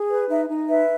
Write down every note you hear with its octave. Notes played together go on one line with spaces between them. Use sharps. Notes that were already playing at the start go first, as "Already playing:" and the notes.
Already playing: G#4
B4
D#4 E5
D#4
B4 E5